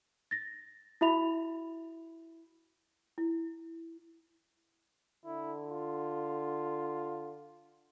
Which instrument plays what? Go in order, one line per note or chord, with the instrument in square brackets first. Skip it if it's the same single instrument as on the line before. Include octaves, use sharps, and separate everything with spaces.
[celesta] A6 A#6
E4 F#4 E5 B5 F7
[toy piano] E4
[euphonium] D3 [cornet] E4
[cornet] F4